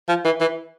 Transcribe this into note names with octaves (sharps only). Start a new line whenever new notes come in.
F3
E3
E3